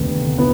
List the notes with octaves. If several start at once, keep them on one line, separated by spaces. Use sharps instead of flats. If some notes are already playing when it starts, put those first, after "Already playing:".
Already playing: F1 D#2 D3 B3
B3